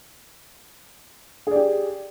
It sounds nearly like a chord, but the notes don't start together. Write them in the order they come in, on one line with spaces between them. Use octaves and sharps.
G#4 D5 G4